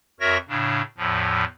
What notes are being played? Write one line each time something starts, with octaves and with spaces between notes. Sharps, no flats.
F2 F#4 A#4 C#5 E5 A#6
A2 C#3 D4
E2 A2 F3